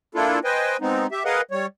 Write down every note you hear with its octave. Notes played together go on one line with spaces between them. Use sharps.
A#3 D4 E4 F4 A4
B4 C5 D#5 G5 G#5
G#3 B3 C4 D#4
G4 E5
G#4 A#4 B4 D#5 F5 F#5
G3 C#5